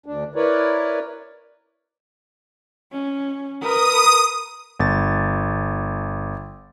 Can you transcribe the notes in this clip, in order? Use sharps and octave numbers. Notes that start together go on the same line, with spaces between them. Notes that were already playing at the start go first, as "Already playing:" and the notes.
D2 D4
E4 A#4 B4 C#5 D5
C#4
A#4 B4 D#6
G1 A6